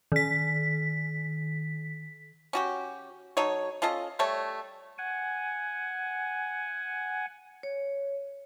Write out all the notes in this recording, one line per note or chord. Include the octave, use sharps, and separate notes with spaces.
D#3 B6
C#4 F#4 G4
F#3 D#4 A4 C#5
C#4 F4 A4 D#5
G3 A3 A4 C#5
F#5 G#5
C#5